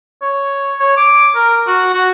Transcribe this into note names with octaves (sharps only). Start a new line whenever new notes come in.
C#5
C#5
D6
A#4
F#4
F#4